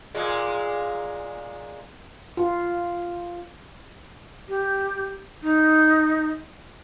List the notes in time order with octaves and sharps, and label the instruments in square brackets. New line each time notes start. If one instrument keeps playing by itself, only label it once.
[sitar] A#2 G#3
[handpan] F4
[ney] G4
D#4